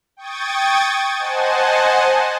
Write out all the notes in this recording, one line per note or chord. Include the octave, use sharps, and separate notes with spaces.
G5 C#6 D#6 G#6 A6
C5 D#5 F#5 G#5 A5